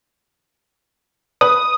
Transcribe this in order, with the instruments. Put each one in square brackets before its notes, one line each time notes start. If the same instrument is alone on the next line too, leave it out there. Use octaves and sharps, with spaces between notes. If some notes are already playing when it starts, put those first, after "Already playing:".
[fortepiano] B4 [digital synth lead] D#6